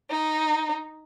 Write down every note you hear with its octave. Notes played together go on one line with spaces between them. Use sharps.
D#4